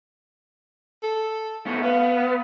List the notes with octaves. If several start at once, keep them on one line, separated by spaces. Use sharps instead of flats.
A4
B2 A3
B3 F5